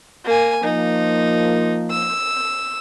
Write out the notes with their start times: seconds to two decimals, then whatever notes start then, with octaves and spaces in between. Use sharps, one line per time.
0.25 A#3 G#5
0.64 F3 A#3 D#4
1.91 E6